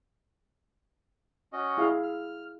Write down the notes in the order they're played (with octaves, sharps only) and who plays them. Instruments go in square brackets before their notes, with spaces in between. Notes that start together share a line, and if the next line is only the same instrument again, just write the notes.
[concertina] C#4 F#4 D#5
[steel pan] E4 G#4 F5
[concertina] F6